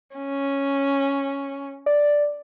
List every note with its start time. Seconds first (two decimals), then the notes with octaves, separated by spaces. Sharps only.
0.16 C#4
1.86 D5